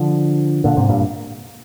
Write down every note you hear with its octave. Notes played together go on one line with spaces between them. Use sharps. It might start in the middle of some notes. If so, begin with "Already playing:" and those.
Already playing: D3 F3
A#2 D3
G#2 C3
G2 A#2